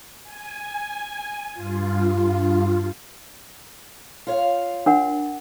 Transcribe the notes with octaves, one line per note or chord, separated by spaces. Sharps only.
G#5
G2 F4
F4 C#5 F5
D4 A#4 F#5